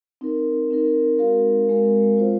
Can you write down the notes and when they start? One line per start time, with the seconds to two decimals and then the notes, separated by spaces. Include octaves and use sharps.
0.21 C4 D#4 A#4
0.70 C4 D#4 A#4
1.19 G#3 C4 F#4 A#4 F5
1.69 G#3 C4 F#4 A#4 F5
2.18 F4 C5 F5